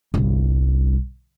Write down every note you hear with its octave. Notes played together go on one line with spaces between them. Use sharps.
G1 C2